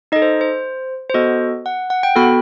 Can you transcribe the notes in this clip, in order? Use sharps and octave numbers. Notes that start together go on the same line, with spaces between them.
D#4 A4 D#5
C5
C5
C5
B3 F#4 A4 D#5
F#5
F#5
G5
B3 F#4 A4 B5